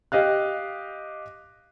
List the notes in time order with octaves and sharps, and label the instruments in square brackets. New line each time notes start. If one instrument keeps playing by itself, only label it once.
[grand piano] G4 D#5 F5 F#6